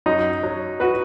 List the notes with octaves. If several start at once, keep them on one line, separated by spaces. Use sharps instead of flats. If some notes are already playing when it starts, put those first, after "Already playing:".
F#2 D#4
F#3
F#4 B4